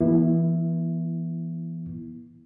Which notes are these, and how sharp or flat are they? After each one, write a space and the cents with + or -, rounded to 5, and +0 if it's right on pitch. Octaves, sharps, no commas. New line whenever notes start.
E3 +20 B3 -35 E4 +0